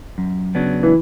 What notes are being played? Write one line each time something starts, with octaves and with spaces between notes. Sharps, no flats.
F#2
C#3 F#3 B3 D4
E3